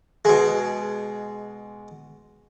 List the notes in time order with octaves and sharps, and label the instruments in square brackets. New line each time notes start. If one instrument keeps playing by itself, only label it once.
[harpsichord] B2 G#3